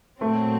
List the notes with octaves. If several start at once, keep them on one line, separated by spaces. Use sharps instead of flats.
A#2 F#3 A3 C4